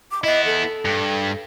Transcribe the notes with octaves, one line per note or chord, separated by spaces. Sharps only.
D6
B3 E4 D#5
A4
G2